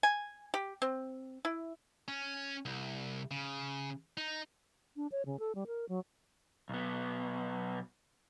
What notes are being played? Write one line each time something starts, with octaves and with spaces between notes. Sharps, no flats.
G#5
G4
C4
E4
C#4
C2
C#3
D#4
D4
C#5
C#3
A4
G3
A#4
F#3
B1 B3